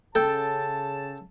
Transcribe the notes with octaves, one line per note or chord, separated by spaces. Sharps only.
C#3 A4 G5 A5